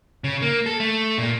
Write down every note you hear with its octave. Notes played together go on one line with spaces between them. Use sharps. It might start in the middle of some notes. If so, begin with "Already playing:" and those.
C#3
A#3
A4
A3
A#2